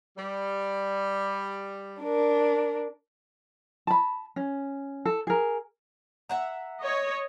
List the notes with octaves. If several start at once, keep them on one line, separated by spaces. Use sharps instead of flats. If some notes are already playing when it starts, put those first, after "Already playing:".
G3
D4 A#4
A5 B5
C#4
A4
G#4 A#4
E5 F#5 A#5
C#5 D#5